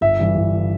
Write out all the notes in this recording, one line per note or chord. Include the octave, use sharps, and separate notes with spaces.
G1 E5
G2 E3
G1
E3